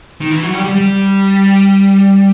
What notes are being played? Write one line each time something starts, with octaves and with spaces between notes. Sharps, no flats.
D#3
E3
F#3
G3
G3
G3